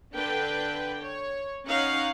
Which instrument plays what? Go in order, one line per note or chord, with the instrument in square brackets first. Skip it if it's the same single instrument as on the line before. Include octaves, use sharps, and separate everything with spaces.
[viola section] D3 D4 B4 G5
C#5
C#4 D#4 C#5 F5 F#5